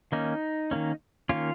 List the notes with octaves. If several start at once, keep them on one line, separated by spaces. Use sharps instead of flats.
D#3 A#3 C#4 D#4
D#3 A#3 C#4
D#3 A#3 C#4 F4